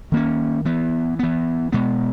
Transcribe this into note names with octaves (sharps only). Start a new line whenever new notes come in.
D#3 A#3 C#4
E3 B3
E3 B3
B2 G#3 B3